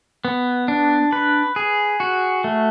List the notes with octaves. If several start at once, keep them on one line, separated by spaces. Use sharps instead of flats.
B3
D4
B4
G#4
F#4
A3